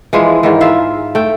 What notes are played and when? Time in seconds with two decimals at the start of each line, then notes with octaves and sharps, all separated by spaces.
0.13 E3 F3 G#3 G#4
0.43 G#2 D#3 E3
0.61 F4 E5 F5
1.15 A3 G5